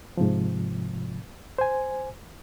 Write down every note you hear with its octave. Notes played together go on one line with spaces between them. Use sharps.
G#2 C3 F3
C5 G#5